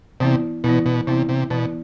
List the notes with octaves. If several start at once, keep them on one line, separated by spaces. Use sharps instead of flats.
C3 E3 B3 E4
B2 E3 B3 E4
B2
C3 E3 B3 E4
C3
B2 E3 B3 E4